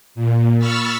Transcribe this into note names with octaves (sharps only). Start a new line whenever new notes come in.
A#2
B5 C#6 E6 F6 A6 B6